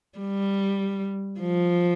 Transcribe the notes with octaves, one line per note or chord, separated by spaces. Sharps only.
G3
F3